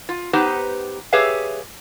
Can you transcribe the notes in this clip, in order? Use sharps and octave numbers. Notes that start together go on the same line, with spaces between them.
F4
B3 D#4 G4 B4 C5
G4 G#4 B4 C#5 E5 F5